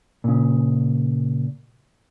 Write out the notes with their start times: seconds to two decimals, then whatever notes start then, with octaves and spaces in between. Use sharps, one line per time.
0.24 A#2 C#3